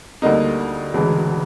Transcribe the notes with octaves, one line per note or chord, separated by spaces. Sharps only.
D2 D3 G3 A#3 D#4
E1 D2 C#3 E3 G#3